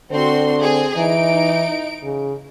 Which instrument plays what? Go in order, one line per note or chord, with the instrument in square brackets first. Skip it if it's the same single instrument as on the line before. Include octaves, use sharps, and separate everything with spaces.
[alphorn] D3 [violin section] C4 F#4 C6
[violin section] C4 G#4
[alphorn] E3 [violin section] D#4 D7
[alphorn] C#3